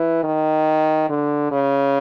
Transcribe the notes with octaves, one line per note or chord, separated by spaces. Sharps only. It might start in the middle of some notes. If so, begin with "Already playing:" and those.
Already playing: E3
D#3
D3
C#3